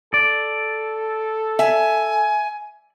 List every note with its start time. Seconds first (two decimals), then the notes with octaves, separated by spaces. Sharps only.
0.14 A4 D5
1.59 E5 G#5